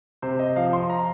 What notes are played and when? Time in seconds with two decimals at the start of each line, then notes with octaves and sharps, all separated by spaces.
0.22 C3 C5
0.39 D#5
0.56 F3 F5
0.73 C6
0.90 A#5